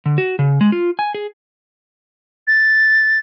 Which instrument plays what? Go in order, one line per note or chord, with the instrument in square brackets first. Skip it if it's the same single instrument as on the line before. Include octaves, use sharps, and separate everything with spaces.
[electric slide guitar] D3
F#4
C#3
G#3
F4
G#5
G#4
[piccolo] A6